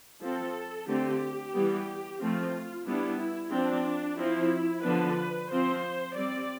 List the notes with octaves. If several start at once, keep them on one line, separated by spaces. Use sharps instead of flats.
F3 C4 A4
D3 A3 C4 G4
E3 G3 B3
F3 A3 C4 F4
G3 B3 D4 E4
E4
F3 C4 D4
F3 C4 E4
D3 F3 B3 D4 B4
F3 C4 C5
G3 C4 D5